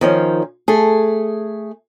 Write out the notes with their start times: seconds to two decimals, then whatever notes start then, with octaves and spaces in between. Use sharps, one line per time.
0.01 D#3 F3 C#4
0.68 A3 G#4